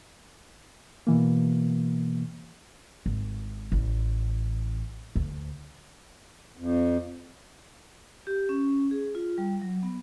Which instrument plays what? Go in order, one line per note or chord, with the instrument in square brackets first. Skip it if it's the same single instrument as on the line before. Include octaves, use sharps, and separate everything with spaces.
[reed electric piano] B2 E3 A#3
[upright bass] G#1
A1
D2
[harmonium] F2
[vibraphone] G4
C#4
G#4
F4
G3
F#3
B3